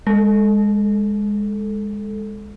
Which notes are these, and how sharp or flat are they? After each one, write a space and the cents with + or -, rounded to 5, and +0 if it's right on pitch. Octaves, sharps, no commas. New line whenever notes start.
G#3 -10 A4 +0